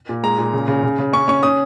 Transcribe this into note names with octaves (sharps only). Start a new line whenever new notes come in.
A#2
G#3 A#5
A#2
C#3
C#3
C#3
C#3
C#4 C#6
C#4 C#6
C#4 D#6